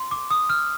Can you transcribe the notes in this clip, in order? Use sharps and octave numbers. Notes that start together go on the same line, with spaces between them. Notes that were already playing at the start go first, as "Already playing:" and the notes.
Already playing: C6
D6
D#6
F6